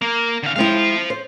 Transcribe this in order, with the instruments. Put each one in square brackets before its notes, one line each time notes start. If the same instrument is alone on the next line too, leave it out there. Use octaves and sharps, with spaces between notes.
[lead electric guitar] A#3
D3 F5
[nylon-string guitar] G#3 C4 E4 [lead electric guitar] C5 F5
[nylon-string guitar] C5